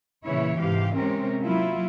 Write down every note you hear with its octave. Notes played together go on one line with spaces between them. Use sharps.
A#2 C#3 E3 E4 C#5
G#2 C3 G4 F5
C3 G#3 C4 C#4 A#4
F#3 A#3 E4 F4